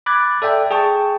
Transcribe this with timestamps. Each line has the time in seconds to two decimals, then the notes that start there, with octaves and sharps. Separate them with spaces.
0.06 B5 D6 F#6 G#6 A6
0.42 A4 D5 E5 G5
0.71 G#4 G5 A5 C#6